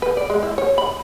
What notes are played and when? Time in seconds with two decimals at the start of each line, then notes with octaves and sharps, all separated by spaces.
0.02 B4
0.17 D5
0.30 G#3
0.43 E4
0.58 C#5
0.78 B5